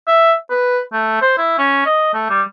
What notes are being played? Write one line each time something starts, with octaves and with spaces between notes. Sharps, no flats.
E5
B4
A3
C5
E4
C#4
D#5
A3
G3